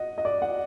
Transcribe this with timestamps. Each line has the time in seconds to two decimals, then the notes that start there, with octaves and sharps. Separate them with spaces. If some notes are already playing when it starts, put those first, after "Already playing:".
Already playing: D#5 F#5
0.18 D#5
0.25 D5
0.42 F#5